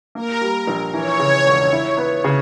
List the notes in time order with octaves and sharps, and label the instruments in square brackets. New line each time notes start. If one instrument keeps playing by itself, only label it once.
[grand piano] A#3 [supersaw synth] A#4
[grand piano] G3
A#1
[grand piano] E3 [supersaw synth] C#5
[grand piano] C#3
E1
E4
B3
C#3